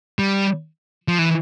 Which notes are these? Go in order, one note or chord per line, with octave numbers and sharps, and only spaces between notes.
G3
F3
E3